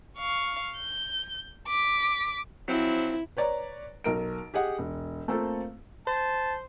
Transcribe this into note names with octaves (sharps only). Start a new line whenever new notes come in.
F5 C#6
G6
D6 B6
F3 F#3 C4 E4
B4 C#5 D5 A#5
B1 A#4 D7
G4 G#4 D#5 F#5
E1
A3 A#3 C4 F4 A4
C5 A5